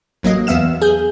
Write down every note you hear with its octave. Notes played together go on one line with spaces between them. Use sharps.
A1 F#3 A#3 D#5
E2 B3 E5 F5 E7
G#4 G6